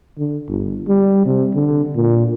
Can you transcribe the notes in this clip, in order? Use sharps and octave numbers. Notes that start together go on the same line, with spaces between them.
D3
G1
G3
C3
D3
A#2